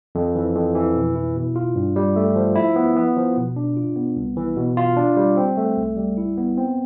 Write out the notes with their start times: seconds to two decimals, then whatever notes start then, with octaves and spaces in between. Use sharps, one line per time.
0.15 F2
0.35 E3
0.55 F2
0.75 E3
0.95 B2
1.16 E4
1.36 B2
1.56 F4
1.75 G2
1.96 G3
2.16 A3
2.36 F3
2.55 E4
2.76 B3
2.96 B3
3.16 F3
3.37 B2
3.56 D4
3.76 F4
3.96 B3
4.17 C2
4.37 E3
4.56 B2
4.77 F4
4.97 D4
5.17 G3
5.37 C4
5.57 A3
5.77 C2
5.97 G3
6.17 E4
6.38 B3
6.57 C4